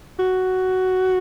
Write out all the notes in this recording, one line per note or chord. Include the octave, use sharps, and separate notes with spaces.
F#4